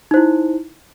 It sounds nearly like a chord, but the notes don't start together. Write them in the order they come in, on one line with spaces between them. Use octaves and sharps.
D#4 C5 E4